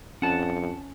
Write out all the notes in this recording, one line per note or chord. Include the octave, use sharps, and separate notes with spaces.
F2 C#4 F#5 A5